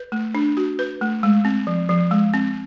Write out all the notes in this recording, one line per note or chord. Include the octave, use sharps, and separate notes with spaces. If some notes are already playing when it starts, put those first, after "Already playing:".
Already playing: B4
A3
D4
F#4
B4
A3
G#3
C4
F3
F3
G#3
C4